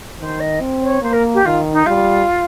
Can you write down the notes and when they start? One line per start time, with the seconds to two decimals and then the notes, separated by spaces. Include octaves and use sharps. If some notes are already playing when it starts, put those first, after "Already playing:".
0.20 D#3 C5
0.40 D#5
0.60 C4
0.81 C#5
1.02 A#3 C5
1.13 A#4
1.34 G4
1.45 D#3 F4
1.73 D#4
1.86 G3 F4